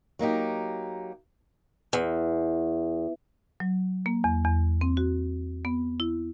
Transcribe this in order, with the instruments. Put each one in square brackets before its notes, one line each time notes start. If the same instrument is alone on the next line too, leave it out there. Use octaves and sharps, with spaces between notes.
[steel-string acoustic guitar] F#3 A#3 D#4 G4
E2
[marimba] F#3
A#3
E2
E2
C4
F#4
B3
E4